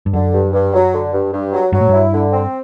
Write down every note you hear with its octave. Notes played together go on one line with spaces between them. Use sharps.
G2
F#2 D3
G2
G2
F#3
D3
G2
G2
F#3
G2 F#3
A2
G2 E4
D3
C4